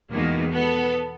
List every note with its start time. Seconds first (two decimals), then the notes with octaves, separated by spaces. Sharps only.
0.11 E2 B2 D#3 G#3 A#3
0.50 B3 A4